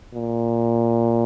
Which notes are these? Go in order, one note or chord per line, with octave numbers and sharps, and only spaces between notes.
A#2